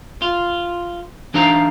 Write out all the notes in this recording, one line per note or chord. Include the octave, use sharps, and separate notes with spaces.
F4
E3 D4 D#4 C5 F5 A#5